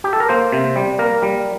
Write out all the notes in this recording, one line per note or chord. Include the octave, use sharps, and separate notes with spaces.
G4
A4
A#4
A#3 C5
C3
G3
A#3 A#4
G3